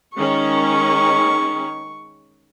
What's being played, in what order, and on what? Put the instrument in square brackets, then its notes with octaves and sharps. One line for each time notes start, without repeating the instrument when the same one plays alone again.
[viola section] D#3 G#3 C#4 [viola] C#6